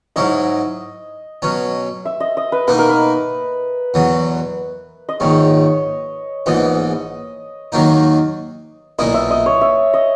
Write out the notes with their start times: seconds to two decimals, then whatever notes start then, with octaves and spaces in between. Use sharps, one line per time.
0.16 G#2 F#3 C#4 E4 D#5
1.42 B2 F#3 C#4
2.05 E5
2.20 D#5
2.37 D#5
2.52 B4
2.68 B2 A#3 D#4 B4
2.79 A#4
2.89 B4
3.94 E2 B2 F#3
5.09 D#5
5.20 A#1 G#2 D#3 C#5
6.46 A#1 G#2 E3 B3 D#5
7.72 D#2 D#3 F#3 A#3 D#4
8.99 B1 A#2 A#3 E4 D#5
9.14 E5
9.31 D#5
9.46 C#5
9.61 E5
9.94 D#5